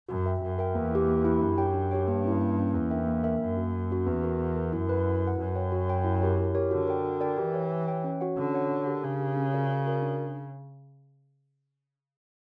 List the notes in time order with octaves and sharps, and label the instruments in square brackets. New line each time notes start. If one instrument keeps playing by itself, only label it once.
[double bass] F#2 [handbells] F#4
[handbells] A#4 E5 G5
[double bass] F#2 [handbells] F#4
[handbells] A#4 E5 G5
[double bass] E2 [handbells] A#3
[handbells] E4 G4
A#3
E4 G4
[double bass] F#2 [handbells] D4
[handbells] G4 C#5 G5
D4
G4 C#5 G5
[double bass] G2 [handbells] A#3
[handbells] C#4 E4
A#3
C#4 E4
[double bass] E2 [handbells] A#3
[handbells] D4 A#4 E5 G5
A#3
D4 A#4 E5 G5
[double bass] F#2 [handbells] A#3
[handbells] C#4 F#4
A#3
C#4 F#4
[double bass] E2 [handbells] B3
[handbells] F#4 A#4
B3
F#4 A#4
[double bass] F#2 [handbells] E4
[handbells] B4 F#5
E4
B4 F#5
[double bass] F#2 [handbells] F#4
[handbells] C#5 G5
F#4
C#5 G5
E4
G4 A#4 C#5
E4
G4 A#4 C#5
[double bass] D3 [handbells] F#4
[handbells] A#4 D5 G5
F#4
A#4 D5 G5
[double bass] E3 [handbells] G4
[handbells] C#5 G5
G4
C#5 G5
C#4
F#4 C#5 F#5
[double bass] D3 [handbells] C#4
[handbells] F#4 C#5 F#5
D4
G4 A#4
[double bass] C#3 [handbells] D4
[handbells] G4 A#4
C#4
F#4 A#4 D5
C#4
F#4 A#4 D5
D4